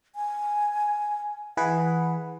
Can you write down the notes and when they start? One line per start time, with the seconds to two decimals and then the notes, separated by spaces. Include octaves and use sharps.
0.15 G#5
1.57 E3 G#4 B4 F#5